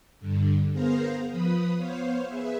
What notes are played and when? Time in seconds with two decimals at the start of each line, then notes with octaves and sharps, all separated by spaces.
0.20 G2 D3
0.72 B3 G#4 A#4 C5 F5 A#5
1.31 F3 B4 B5 D#6
1.77 B3 C5 C#5 F5
2.27 G#4 B4 E5